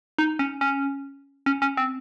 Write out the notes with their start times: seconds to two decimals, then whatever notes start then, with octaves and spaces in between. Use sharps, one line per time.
0.18 D#4
0.39 C#4
0.61 C#4
1.46 C#4
1.62 C#4
1.77 C4